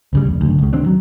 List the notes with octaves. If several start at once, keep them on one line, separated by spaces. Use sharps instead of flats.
D2 C#3 G3
F1
F#1 D2
C#2 C#3
D2 D#3 C4 D4
F#3